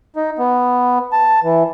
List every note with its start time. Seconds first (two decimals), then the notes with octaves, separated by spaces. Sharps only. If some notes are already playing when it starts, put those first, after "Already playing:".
0.16 D#4
0.39 B3
1.13 A5
1.43 E3